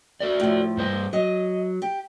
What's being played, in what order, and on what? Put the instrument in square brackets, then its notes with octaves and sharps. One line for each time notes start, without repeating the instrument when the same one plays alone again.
[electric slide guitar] F#4 A4 D5
[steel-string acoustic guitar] A2 F3
[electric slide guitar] G2 C5 D#5
[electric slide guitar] F#3 [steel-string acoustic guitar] D#5
[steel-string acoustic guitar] G4